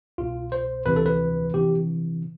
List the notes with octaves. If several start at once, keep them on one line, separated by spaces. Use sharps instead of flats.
C2 B2 F4
C5
D2 C3 E3 B4
A4
B4
C3 E3 G4